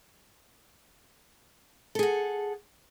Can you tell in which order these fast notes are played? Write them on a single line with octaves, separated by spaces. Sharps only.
A4 G#4 F#5